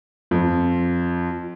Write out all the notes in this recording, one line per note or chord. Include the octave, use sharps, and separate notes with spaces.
F2 F4